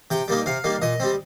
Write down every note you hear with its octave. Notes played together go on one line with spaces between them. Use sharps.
C3 G5
G3 A#3 D#4
C3 F5
G3 A#3 D#4
A#2 D#5
G3 C4